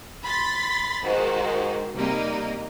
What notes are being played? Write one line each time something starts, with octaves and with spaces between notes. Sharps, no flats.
B5 C6 A6 B6
G#2 D#3 F#4 C5
C3 G3 A#3 D#4